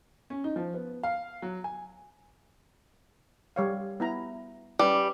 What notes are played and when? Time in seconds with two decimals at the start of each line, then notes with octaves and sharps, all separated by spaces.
0.30 C#4
0.44 D#4
0.56 F3
0.74 B3
1.03 F5
1.42 F#3
1.64 G#5
3.56 G3 C#5 F5
4.00 B3 E4 A#5
4.79 G3 C#4 B4 D5